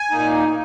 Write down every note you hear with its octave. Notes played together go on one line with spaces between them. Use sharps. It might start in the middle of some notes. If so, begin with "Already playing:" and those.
Already playing: G#5
A#2 A#3 D#4